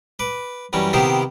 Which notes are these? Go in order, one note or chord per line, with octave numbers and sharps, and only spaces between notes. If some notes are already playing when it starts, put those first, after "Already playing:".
B4 D6
F#2 E3 G3 C#4
C3 D#3 B3 E4 G4 C5